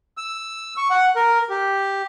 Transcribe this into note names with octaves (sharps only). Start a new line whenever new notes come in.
E6
C#6
F#5
A#4
G4